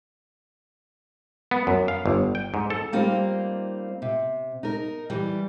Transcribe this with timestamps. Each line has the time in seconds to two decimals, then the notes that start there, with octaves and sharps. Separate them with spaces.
1.51 B3
1.67 F#2
1.88 F5
2.06 G1
2.35 G5
2.54 G#2
2.70 A4
2.93 G3 A#3 C4 D#4 F4
4.02 C3
4.63 D#4 A#4
5.10 E3 G3